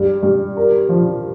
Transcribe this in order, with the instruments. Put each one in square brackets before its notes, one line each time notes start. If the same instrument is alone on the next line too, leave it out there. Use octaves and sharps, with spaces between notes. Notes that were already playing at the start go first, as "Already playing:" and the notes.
Already playing: [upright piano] G2
G2
A#4
F3